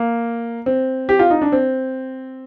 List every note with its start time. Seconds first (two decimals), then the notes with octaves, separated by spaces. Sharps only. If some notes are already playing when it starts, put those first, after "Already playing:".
Already playing: A#3
0.66 C4
1.09 G4
1.19 F4
1.30 D#4
1.42 D4
1.52 C4